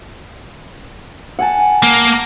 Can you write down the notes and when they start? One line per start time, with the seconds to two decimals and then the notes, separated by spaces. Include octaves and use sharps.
1.39 F#5 G#5 A5
1.83 A#3